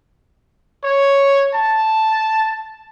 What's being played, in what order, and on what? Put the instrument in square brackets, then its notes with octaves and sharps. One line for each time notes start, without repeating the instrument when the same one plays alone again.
[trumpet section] C#5
A5